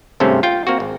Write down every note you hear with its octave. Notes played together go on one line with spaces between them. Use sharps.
G#1 G2 C3 A3 C#4 C5
F4 G5
A#3 C4 F#4
G#1